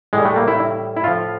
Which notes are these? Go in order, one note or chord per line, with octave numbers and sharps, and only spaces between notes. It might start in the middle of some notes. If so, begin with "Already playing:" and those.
A2 E3 G3 G#3
A3
A#3
E4
E4
A2 F3 F4